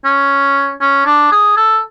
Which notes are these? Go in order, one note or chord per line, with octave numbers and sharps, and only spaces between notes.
C#4
C#4
D4
G#4
A4